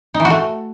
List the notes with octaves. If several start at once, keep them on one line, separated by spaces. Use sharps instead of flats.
D#4
E3
F#4
A3